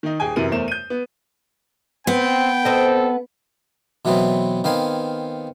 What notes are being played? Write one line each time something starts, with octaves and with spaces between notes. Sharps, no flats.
D#3 D#4
D#1 G#4 G5 G#5
F#2 C3 E3 A#4 D#7
E2 A3 A#4 C5 E7
G6 D#7
B3
B3 C4 G5
C4 A4 D#5
B2 E3 F#3 A3 B3 C4
D#3 B3 C4 F5 G#5